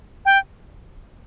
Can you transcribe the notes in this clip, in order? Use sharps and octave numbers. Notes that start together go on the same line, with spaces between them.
G5